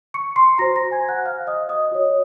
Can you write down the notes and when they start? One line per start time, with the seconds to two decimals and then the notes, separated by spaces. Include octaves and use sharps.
0.14 C#6 C#7
0.36 C6 C7
0.58 F#4 C5 A#5 A#6
0.76 A#5 A#6
0.91 G#5 G#6
1.09 F#5 F#6
1.26 F5 F6
1.47 D#5 D#6
1.69 D#5 D#6
1.91 F#4 C#5